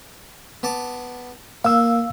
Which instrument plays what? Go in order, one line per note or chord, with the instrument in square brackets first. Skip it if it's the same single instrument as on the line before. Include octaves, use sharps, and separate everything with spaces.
[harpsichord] B3 A5 D6
[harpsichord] A#3 [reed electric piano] F5 E6